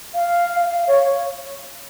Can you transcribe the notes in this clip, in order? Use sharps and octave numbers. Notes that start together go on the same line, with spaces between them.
F5
F5
C#5